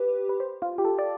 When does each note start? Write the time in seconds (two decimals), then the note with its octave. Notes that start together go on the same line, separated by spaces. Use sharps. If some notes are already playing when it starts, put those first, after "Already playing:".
Already playing: G4 B4
0.29 B4
0.40 C5
0.62 F4
0.78 G4
0.85 A4
0.99 D5